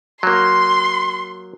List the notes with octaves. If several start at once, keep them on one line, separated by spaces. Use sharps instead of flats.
F#3 A#3 C6